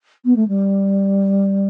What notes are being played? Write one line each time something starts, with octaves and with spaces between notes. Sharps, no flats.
B3
A3
G3